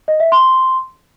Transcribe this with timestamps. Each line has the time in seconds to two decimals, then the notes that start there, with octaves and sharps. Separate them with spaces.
0.08 D#5
0.20 E5
0.32 C6